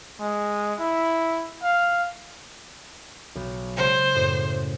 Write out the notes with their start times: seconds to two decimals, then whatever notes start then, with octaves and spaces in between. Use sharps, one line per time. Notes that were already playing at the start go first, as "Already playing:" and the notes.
0.20 G#3
0.80 E4
1.63 F5
3.35 B1
3.77 C#3 G#3 C5
4.15 F#2 A2